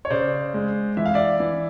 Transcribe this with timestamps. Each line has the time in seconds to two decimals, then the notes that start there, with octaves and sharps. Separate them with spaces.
0.05 C#5
0.10 C#3 C5 D5
0.54 G#3
0.97 E3 E5
1.06 F5
1.14 D5 E5
1.40 E3